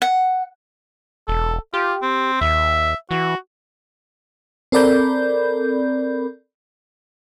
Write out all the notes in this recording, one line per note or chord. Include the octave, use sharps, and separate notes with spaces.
F#5
E1 A4
F4 G4
C4
D#2 E5
E3 F#4
C4 A4 A#4 D5 B5 G6